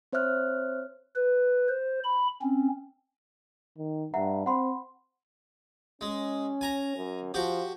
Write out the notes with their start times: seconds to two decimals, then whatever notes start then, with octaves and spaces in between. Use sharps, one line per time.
0.12 C4 C5 C#5 E5 F6 F#6
1.16 B4
1.69 C5
2.04 B5
2.41 C4 C#4
3.78 D#3
4.14 G2 E5 F#5 A#5
4.46 C4 F#5 B5 C6
6.01 G#3 C#4
6.61 G#5 A#5
6.96 F#2
7.34 F3 F#4 G4